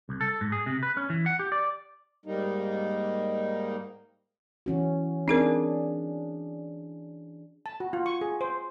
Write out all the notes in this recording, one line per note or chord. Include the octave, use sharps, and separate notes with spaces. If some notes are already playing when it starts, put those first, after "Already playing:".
C2
A4
G#2
G#4
C3
B4
C#4
E3
F#5
G4
D5
G#2 G3 A#3 D#4
E3 C#4 F#4
C4 D4 D#4 G#4 A#4
A5
F#4
F4
C#6
G#4
C5